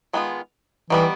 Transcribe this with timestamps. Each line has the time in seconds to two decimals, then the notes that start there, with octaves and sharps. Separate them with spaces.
0.13 D#3 G#3 B3 D4 F4
0.90 D#3 E3 G3 B3